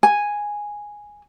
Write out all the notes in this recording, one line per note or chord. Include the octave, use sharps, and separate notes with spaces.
G#5